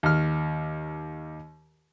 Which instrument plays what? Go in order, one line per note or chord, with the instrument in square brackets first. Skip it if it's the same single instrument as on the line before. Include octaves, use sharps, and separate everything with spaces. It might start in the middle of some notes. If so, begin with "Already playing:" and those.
[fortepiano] D#2 F6